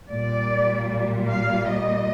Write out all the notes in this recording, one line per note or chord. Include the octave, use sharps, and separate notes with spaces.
A#2 G3 D5
F5
D#5